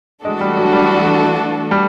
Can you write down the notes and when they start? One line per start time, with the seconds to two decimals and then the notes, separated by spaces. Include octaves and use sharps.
0.24 E3 G#3 A3 D4 F#4 A4
0.41 G3
0.57 F#3
0.73 G3
1.71 G3